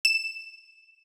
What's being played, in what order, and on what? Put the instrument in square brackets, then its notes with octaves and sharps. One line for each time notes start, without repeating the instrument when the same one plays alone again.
[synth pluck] E7